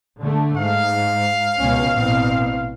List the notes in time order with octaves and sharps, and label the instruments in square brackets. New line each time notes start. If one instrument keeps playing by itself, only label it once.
[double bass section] D3 A3
[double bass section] G#2 [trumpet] F5
[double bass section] C#2 B2 C#4
A1 B2 C4